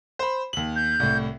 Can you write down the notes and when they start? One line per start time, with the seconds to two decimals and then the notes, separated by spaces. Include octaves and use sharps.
0.19 C5 B5
0.53 D#2 F#7
0.76 G6
1.00 C2 A2